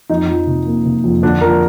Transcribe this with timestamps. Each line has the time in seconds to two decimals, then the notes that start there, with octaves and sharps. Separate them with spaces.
0.09 F2 D#4 D#5
0.28 F3
0.47 C3
0.67 A#3
0.85 C3
1.04 F2
1.23 D3 D4 D5
1.41 F3 A#4